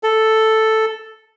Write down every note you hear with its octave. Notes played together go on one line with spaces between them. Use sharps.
A4